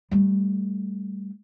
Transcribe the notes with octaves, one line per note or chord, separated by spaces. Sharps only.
G3 A3